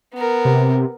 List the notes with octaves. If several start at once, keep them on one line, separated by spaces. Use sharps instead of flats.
B3 A#4
C3